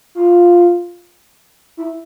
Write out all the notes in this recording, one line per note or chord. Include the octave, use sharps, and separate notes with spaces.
F4
E4